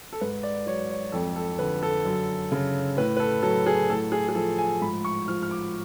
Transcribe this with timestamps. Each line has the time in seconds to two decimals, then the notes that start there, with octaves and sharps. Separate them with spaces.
0.13 A4
0.21 G#2 B4
0.43 D5
0.66 F#3 C#5
0.90 C#5
1.12 F2 A4
1.36 A4
1.59 D3 B4
1.83 A4
2.05 F#2
2.52 C#3
2.97 A2 B4
3.17 B4
3.20 A4
3.43 F#3 A4
3.66 G#4
3.90 A2 A4
4.12 G#4
4.29 G#4
4.35 F3 A4
4.58 G#5
4.81 G#2 B5
5.05 C#6
5.28 F3 F6
5.43 F6
5.51 D6